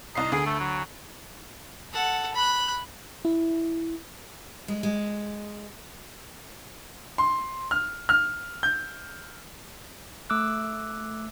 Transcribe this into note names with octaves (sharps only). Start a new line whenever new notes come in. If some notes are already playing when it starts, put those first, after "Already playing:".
C2 D#4 C7
D2 G#4
A3
F#3
A4 F#5
B5 F#6
E4
G#3
G#3
C6
F6
F6
G6
A3 D6 E6 F#6